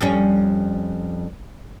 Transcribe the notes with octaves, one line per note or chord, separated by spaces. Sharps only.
F2 G3 C#4